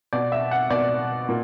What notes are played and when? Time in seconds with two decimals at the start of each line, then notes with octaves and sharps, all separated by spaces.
0.13 B2 D5
0.32 E5
0.51 F#5
0.70 B2 D5
1.29 A#2